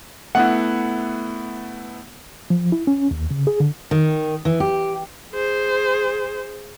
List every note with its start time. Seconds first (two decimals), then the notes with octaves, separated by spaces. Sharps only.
0.35 A3 B3 E4 F#5
2.50 F3
2.72 E4
2.87 C#4
3.11 D#2
3.31 C#3
3.47 G#4
3.60 D3
3.91 D#3
4.45 E3
4.60 G4
5.33 G#4 C5